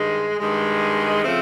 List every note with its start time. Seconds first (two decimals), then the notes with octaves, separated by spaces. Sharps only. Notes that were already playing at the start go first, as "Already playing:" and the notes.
Already playing: G2 D#3 G#3
0.40 G2 D#3 G#3
1.24 C#3 F3 A3 C4